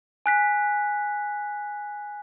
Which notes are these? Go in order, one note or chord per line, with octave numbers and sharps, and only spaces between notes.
G#5 F#6 B6